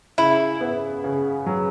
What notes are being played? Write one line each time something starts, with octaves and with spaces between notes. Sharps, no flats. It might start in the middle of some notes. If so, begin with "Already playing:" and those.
C#3 E4
B3
C#3
F#3